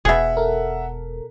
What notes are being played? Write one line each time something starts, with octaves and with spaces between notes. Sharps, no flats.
E1 B2 G#4 E5 F#5
A4 A#4